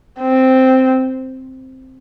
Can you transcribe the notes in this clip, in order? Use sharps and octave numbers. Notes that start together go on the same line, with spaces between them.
C4